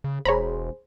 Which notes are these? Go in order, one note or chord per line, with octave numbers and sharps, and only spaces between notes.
C#3
E1 G#4 C5 C#5 A#5 B5